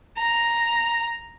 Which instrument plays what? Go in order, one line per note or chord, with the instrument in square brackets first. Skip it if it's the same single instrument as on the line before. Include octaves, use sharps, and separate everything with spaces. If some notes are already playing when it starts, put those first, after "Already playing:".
[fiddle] A#5